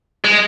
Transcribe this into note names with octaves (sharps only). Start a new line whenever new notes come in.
G#3